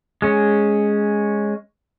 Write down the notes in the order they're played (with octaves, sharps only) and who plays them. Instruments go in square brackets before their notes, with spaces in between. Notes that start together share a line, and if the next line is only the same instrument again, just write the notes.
[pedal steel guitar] G#3 C#4